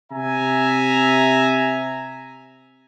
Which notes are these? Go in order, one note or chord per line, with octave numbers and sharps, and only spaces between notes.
C3 E5 G#5 A#5